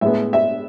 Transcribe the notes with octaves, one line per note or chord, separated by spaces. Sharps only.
A2 G#3 B3 E5
E5